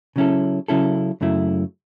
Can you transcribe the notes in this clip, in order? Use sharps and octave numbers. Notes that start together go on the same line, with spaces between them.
C#3 F#3 C#4 E4 A4
C#3 F#3 C#4 E4 A4
F#2 C#3 F#3 A3 E4